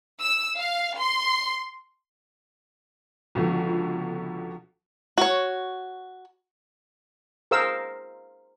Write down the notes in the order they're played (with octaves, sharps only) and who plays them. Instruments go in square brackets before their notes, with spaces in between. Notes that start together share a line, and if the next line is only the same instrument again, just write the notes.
[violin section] E6
F5
C6
[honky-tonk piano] C#2 B2 D3 [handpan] F3 F#4
[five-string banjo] F#4 C#5
[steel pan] G#4 A#4 C5 F5 E6